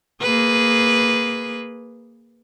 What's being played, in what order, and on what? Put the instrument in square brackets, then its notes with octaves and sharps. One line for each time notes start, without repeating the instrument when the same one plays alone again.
[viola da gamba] A#3 G#4 B4